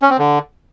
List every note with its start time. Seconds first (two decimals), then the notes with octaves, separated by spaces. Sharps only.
0.02 C#4
0.10 C4
0.18 D3